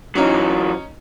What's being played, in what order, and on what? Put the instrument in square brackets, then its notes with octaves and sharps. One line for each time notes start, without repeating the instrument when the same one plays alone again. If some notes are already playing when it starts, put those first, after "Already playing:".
[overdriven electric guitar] E3 F#3 [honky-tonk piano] C#4 D#4